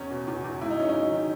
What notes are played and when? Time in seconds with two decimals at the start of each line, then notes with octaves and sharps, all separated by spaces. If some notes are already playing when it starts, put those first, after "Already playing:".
Already playing: E2 C#4
0.11 B2
0.28 E2
0.44 E2
0.61 G#2 E4
0.70 D#4
0.79 F#3 C#4
0.89 D#4
0.96 F#3
1.12 D#3